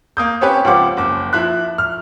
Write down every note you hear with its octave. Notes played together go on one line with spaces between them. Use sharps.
A#3 D#6 G6
C4 C#4 G4 B4 C#5
C#2 F3 C4 G4 F#5 D6
F#1 D6
F3 E4 F#6
F6